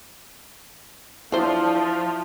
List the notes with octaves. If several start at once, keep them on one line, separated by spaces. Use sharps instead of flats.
D3 F3 A3 E4 C5 F5